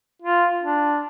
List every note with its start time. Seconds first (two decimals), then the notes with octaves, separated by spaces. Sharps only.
0.22 F4
0.63 D4